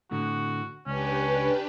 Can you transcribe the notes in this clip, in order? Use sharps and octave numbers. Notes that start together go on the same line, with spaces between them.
A2 D3 F#4
C#2 C#4 D4 G4 B4